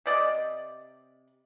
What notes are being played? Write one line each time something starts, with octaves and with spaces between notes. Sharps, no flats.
C3 D5 D#5